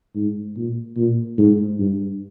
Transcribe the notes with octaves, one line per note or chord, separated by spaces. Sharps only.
G#2
A#2
A#2
G#2
G2